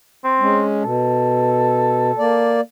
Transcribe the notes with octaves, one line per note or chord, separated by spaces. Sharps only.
C4
G#3 C#4
B2 A4
A#3 D5